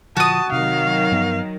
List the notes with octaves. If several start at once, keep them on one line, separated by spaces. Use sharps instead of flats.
A#2 D3 F3 F#4 A5 D#6
C3 D#3 F#3 F5
G2 F3 B3